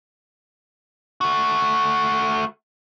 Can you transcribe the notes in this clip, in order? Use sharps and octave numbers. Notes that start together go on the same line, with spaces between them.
A3 F#4